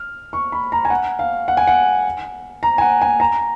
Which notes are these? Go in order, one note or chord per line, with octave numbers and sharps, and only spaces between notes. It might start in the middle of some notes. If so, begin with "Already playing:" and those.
Already playing: F6
C#6
B5
A#5
G#5
F#5
F5
F#5
G#5
F#5
A#5
G#5
F#5
G#5
A#5